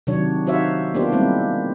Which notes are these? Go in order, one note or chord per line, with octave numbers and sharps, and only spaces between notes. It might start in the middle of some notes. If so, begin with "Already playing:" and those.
C3 D#3 F#3 D4 C#5
D#4 F#4 C5 C#5 E5 F5
A#3 B3 D4 F4 G4 C5
G3 G#3 A#3 C4 E4